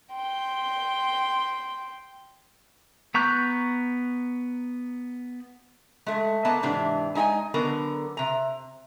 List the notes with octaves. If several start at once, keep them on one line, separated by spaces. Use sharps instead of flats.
G5 C6
B3 A#5 C#6 F#6 G6
G#3 A3
A#3 B3 D#5 A5
G#2 C3 E3 D4
G#3 D#4 D#5 G5 G#5
D3 F#3 B3 A#4
C3 A#5